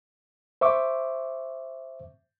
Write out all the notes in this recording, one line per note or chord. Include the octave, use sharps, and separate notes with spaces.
C5 E5 C#6 D6